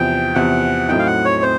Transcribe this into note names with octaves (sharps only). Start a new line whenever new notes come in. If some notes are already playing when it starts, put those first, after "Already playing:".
Already playing: E2 C3 F3 G5
E2 C3 F3 F#5
A2 F#3 A3 C4 D#4 G5
F5
F#5
C#5
C4 C5